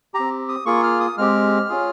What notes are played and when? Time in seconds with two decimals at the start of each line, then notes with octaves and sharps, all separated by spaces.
0.14 G4 A#5
0.19 C4
0.49 D#6
0.66 A#3 F4 G#4 C#6
0.83 F6
1.00 D#6
1.18 G#3 C4 G4 F6
1.69 C#4 F4 G#4